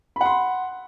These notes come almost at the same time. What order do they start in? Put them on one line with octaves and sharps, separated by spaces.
B5 F#5 C6